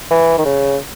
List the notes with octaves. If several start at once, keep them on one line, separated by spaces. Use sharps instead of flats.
E3
D#3
C#3